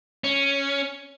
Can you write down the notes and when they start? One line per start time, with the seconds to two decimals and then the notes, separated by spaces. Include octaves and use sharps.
0.24 C#4